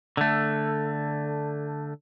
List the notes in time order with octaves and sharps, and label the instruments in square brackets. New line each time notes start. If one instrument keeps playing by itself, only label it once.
[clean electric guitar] D3 A3